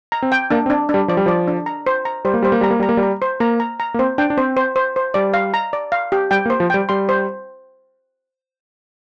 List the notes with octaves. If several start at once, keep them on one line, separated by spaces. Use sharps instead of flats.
A#5
C4
G5
A#3 D4
C4
D4
D4
G3
F3 D5
G3
F3 D5
D4
A#5
C5
A#5
G3 C5
A#3
G3 C5
A#3
G3 A#5
A#3
G3 A#5
A#3
G3
A#5
C5
A#3 A#5
A#5
A#5
A#3
C4 C5
D4 G5
D4
C4 C5
C5
C5
C5
G3 D5
F5
A#5
D5
F5
G4
G3 G5
A#3
C5
F3
G3 G5
G3 C6
C5